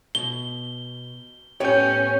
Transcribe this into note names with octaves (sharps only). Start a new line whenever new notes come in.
B2 G7
A2 B3 C#4 G4 C#5 G6